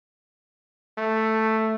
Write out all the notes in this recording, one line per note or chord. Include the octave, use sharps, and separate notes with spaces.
A3